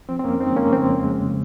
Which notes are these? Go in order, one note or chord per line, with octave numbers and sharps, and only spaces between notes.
F3 C4
C4
F2 A#3 C#4
G#3 C4 D#4
C#3 A#3 C#4
F3 C4
F2
G#3
C#3